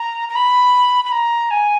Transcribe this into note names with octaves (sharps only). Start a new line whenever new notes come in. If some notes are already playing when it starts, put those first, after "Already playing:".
Already playing: A#5
A#5
B5
B5
A#5
G#5